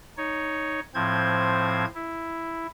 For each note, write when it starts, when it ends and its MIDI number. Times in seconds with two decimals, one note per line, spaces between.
0.17 0.80 63
0.17 0.80 73
0.94 1.85 45
0.94 1.85 53
0.94 1.85 60
0.94 1.85 72
0.94 1.85 92
1.95 2.66 64